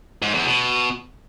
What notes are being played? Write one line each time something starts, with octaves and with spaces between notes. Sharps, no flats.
G#2
E2
B2